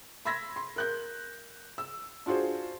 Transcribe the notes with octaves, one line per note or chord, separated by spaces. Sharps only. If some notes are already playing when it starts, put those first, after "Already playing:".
B5 C6 E6 G#6 A#6 B6
C6
A#4 F#6 G6
E6
D4 F4 F#4 G#4 C5